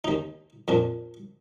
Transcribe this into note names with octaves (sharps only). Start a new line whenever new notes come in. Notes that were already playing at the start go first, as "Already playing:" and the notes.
D#2 D#4
F2 A#2 D4